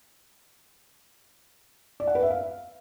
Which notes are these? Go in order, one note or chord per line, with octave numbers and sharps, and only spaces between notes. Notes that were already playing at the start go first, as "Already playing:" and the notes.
D5
F#5
B4
E5
F5